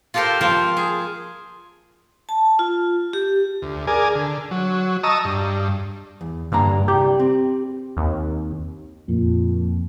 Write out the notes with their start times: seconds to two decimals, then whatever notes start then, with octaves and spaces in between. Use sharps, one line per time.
0.14 F4 G4 A4 A#4 C5
0.41 F3 A#3 F4 C5
0.77 G#4
2.29 A5
2.59 F4
3.13 G4
3.62 D2
3.87 G#4 A#4 D5 G#5
4.15 D3
4.51 F#3
5.03 D#5 A5 A#5 C#6 D#6 E6
5.25 G2
6.21 E2
6.52 G2 D3 A#3 A#5
6.88 C2 G3 G4
7.19 C4
7.97 D#2
9.08 F2 A#2